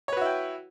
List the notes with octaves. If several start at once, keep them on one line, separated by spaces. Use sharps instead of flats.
E4 F#4 B4 C#5 G5